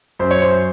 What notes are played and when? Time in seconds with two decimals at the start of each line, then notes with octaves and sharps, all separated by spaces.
0.19 F#2 C5
0.31 C#5
0.42 C5